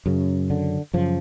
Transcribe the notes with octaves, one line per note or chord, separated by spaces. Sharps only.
F#2 C#3
D3
F#2 C#3 F3